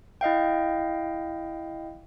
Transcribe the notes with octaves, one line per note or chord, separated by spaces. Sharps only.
E4 D#5 F5 G5